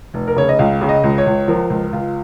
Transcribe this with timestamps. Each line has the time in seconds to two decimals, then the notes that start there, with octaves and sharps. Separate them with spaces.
0.14 F1
0.27 A#4
0.37 C#3 C#5
0.49 D#5
0.59 C#2 F5
0.82 C#3
0.89 D#5
1.04 C#2
1.18 C#5
1.26 C#2
1.48 F3 A#4
1.70 C#2
1.93 C#2 F4